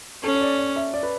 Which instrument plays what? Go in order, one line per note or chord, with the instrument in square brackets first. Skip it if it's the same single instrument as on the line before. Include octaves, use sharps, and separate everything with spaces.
[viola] C#4 [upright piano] A4
[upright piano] C#5
D5
D5
E5
D5
B4